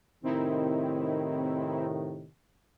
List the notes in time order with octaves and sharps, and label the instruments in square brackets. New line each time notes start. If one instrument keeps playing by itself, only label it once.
[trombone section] A2 C3 D#3 [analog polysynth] C4 D#4 E4